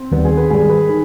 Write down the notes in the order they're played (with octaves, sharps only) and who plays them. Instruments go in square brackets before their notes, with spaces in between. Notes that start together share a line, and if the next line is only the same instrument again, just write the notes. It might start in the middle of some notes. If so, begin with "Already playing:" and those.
Already playing: [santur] C4
[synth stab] D#2 D#3 G3 B3
[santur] G#4
B4
[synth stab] G#2 D#3 G3 [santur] G#4
[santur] B4
[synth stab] D#3